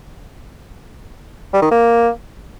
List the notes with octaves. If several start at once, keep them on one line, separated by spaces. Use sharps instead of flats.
G3
D#3
A#3